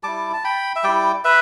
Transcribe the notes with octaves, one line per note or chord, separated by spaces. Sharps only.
G3 E4 A5 D6
A5
G5 B5
E5
G3 E4 D5 G5
B4 E5